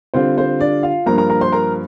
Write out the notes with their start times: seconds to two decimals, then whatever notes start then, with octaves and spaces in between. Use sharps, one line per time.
0.14 D3 G3 C4 F4 C5
0.37 C4 C5
0.60 D4 D5
0.83 F4 F5
1.06 G2 F3 A#3 A#4 A#5
1.18 A#4 A#5
1.29 A#4 A#5
1.41 C5 C6
1.52 A#4 A#5